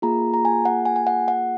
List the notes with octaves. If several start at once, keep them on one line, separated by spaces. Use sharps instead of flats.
A#3 F4 G#4 A#5
A#5
G#5
F#5
G#5
G#5
F#5
F#5